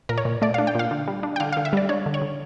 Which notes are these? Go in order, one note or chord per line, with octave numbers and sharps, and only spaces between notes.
A#2 A#4
C#5
A#2
A3 D5
D4 F5
G5
A#2 F5
D3
G3
D4
G5
D3 F5
D3 F5
E5
G3 D5
D4 C#5
D3
C#5
D3